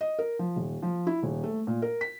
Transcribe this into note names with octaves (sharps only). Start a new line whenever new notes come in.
D#5
A#4
F3
D#1
F3
E4
D#1
A3
A#2
A#4
B6